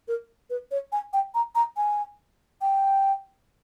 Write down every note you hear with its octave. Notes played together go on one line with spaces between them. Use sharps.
A#4
B4
C#5
G#5
G5
A#5
A#5
G#5
G5